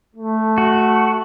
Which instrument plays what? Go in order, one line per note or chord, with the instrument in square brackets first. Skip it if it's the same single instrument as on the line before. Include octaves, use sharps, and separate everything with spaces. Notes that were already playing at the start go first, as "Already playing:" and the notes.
[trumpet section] A3
[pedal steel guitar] F#4